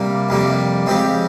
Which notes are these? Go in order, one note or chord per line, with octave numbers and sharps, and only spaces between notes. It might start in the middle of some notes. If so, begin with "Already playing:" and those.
Already playing: C3 G3 A#3
F2 C3 G3 A#3
F2 C#3 G#3 C4 G4